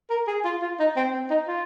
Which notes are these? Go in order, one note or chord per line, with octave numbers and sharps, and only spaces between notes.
A#4
G#4
F4
F4
D#4
C4
C4
D#4
F4